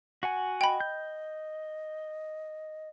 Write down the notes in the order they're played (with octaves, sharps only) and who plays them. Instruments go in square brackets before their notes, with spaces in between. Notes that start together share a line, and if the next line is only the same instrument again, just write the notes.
[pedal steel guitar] F#4 F#5 G#5
[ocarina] D#5 [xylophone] G5 B5
[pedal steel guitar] G6